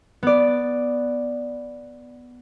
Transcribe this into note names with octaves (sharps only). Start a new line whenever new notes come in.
B3 D5